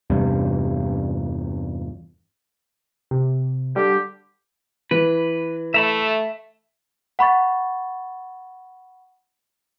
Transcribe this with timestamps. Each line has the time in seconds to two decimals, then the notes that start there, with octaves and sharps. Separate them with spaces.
0.10 E2 G2 C3
3.11 C3
3.76 D3 G3 G4
4.91 E3 B4
5.74 A3 E5 A#5 B5
7.19 F#5 B5 C#6 A6